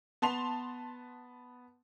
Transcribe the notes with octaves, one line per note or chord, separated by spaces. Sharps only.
B3 A5 C6 F7